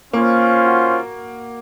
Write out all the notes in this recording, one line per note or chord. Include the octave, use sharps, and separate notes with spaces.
A#3 C#4 F4 C5
F#4